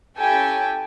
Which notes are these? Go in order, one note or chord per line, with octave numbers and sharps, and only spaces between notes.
C#4 E4 G4 A4 G5 G#5